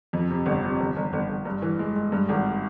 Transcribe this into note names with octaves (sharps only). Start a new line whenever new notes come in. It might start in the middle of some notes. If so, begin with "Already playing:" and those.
F2
C3
G1
C3
G1
G1
G1
G1
G2
E3
G#3
G#3
G2
G#1